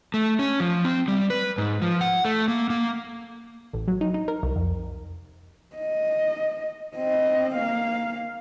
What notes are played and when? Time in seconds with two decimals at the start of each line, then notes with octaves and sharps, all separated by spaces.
0.14 A3
0.39 C#4
0.60 F3
0.85 C4
1.08 G3
1.30 B4
1.58 G#2
1.82 F3
2.01 F#5
2.25 A3
2.48 A#3
2.70 A#3
3.73 A1
3.88 F#3
4.01 D#4
4.14 D#4
4.28 A#4
4.43 C2
4.56 F2
5.76 D#5
6.97 C4 D#5
7.55 A#3 F5